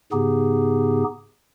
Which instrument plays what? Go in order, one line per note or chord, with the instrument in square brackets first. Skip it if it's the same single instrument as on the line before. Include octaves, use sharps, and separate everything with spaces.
[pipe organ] G#2 C#3 B3 D#4 G4 G#4